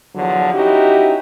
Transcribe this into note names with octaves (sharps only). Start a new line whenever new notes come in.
E2 D3 F3 F#3
C#4 D#4 E4 F#4 G4